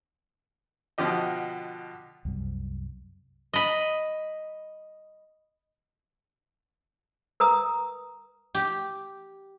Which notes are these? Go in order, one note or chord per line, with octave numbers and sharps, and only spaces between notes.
B2 D3 F3 G4 D#5
C2 F#2 G3
D#5 B5
A#4 B4 A#5 D#6
G4